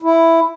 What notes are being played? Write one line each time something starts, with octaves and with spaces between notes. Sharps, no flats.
E4